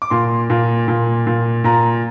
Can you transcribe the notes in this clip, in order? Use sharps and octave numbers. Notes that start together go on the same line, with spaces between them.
D6
A#2 C6
A#2
A#2
A#2
A#2 A#5